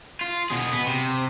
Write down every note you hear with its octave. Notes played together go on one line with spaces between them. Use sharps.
F4
B2 G#4
B3
C3